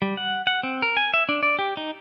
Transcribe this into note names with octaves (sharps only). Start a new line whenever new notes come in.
G3
F#5
F#5
C4
A#4
G#5
E5
D4
D5
G4
D#4